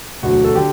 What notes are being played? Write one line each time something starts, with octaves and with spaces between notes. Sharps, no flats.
E1 D2 D3 F#3 F#4
A4
D3 G4